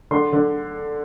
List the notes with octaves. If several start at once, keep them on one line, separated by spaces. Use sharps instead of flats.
D3 C6
D3